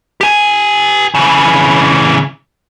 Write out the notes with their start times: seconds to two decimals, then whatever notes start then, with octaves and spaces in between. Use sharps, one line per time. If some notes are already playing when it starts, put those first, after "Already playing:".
0.21 G4 G#5
1.15 C#3 E3